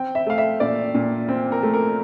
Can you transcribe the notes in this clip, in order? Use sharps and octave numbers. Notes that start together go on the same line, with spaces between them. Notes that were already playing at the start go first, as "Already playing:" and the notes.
Already playing: C4 G5
E5
A3 F5
E5
A#2 D5
A#2
C4
A#4
A3
A#4